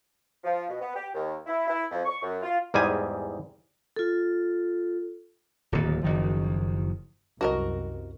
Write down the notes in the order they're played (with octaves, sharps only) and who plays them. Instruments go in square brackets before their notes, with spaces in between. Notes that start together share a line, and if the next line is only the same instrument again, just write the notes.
[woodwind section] F3
B2
B3
G4
D#2
E4
E4
F2
C#6
F#2
F4
[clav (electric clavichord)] E2 G#2 G3 G#4 G#5
[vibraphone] F4 A4
[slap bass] D1 D#2
F#1 D#3 F3
[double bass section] C2 F#2 [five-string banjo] F#4 A#4 D#5